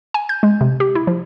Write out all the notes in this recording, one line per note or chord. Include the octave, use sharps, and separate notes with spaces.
G#5
G6
G#3
C3
G4
E4
F3